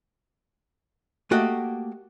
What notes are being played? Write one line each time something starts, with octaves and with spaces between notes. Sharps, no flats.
A3 A#3 F#4 G4 D#5